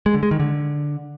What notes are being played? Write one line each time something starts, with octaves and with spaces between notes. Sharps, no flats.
G#3
D3
G#3
D#3
D3